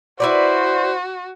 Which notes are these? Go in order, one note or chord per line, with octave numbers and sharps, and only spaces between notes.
E4 F#4 B4 C5 D5